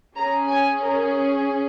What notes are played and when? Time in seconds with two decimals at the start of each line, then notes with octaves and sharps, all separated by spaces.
0.16 C#4 G#4 A#5
0.49 G#5
0.82 A#4